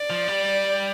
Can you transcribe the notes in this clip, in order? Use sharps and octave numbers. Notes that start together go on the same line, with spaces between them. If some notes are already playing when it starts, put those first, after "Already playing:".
Already playing: D5
F3
G3